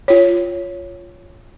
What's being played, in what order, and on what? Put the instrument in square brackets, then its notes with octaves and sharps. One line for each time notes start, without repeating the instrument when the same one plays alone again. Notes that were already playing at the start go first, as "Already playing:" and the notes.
[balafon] F4 C#5